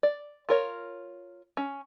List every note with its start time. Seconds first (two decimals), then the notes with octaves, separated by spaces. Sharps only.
0.03 D5
0.49 F4 A#4 C#5
1.57 C#4